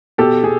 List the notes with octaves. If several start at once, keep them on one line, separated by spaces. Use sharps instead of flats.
B2 G4 A4
B2 G#4